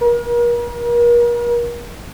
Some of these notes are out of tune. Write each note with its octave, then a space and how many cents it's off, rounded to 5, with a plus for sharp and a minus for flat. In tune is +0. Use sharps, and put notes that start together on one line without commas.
A#4 +40